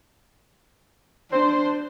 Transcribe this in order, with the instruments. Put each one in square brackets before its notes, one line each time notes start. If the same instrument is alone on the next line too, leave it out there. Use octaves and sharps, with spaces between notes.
[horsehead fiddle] D4 [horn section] C5